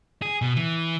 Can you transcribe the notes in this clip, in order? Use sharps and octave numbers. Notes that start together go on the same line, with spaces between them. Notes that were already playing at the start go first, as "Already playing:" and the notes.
G#4
B2
E3